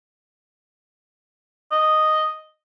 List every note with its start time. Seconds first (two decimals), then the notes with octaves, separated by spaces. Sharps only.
1.72 D#5